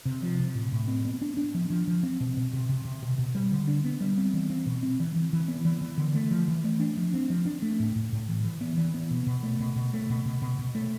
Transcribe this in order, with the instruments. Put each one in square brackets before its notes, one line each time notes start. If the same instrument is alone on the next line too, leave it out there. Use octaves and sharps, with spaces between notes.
[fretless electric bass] C3
F3
C3
A2
A2
C4
B3
D4
D4
F3
F3
F3
C4
B2
B2
C3
C3
C3
B2
B2
G3
D3
D4
B3
G3
C4
E3
C4
B2
C4
E3
E3
E3
B3
E3
E3
D3
A3
F3
E3
A3
D4
F3
C4
F3
D4
A3
A2
A2
A2
E3
E3
B3
E3
B3
B2
B2
A3
B2
B2
A3
B2
B2
B2
B2
A3